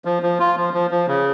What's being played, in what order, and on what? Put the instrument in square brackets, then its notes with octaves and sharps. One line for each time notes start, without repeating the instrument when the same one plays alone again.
[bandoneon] F3
F3
F4
F3
F3
F3
C#3